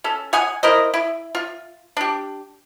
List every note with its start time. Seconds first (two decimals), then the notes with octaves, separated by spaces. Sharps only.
0.04 C#4 A4
0.33 C#5 D#5 F#5 G#5
0.63 E4 A#4 C5 D#5
0.94 E4
1.35 F4
1.97 D4 G4